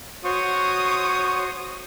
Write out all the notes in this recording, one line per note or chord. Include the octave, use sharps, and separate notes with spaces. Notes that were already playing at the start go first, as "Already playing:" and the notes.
F#4 C5 C#5 C6 C#6 D#6